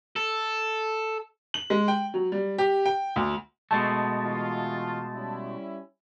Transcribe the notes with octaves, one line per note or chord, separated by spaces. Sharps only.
A4
F#7
G#3
G5
F#3
G3
G4
G5
D2
B2 G#3 A3 A5
E3 F4
G3 C#4 E4